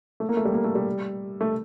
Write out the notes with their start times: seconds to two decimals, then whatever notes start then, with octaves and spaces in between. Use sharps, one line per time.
0.20 A3
0.29 A#3
0.37 A3
0.45 G3
0.54 A#3
0.64 A3
0.75 G3
1.41 A3